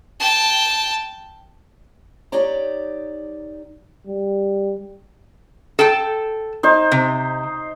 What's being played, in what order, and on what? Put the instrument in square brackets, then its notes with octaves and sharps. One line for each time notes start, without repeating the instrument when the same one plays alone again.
[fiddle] G5 A5
[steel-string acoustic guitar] D#4 G4 C#5 D5 A#5
[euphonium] G3
[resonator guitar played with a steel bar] A4 G5 A5
[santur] D#4 C5
[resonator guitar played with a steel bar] C3